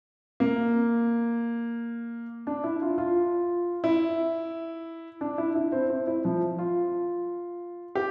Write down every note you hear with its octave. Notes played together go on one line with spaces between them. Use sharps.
A#3
D4
E4
F4
F4
E4
D4
E4
E4
C4
C4
E4
F3
F4
G4